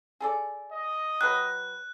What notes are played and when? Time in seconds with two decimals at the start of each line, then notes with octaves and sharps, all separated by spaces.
0.21 G#4 A4 D5
0.72 D#5
1.21 F#3 G4 B4 F#6